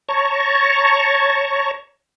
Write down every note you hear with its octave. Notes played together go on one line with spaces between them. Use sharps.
C#5 A5 A#5 C#6